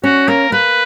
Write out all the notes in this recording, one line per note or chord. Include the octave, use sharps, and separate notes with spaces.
C#4 F#4
A#3 A#4
A#3 B4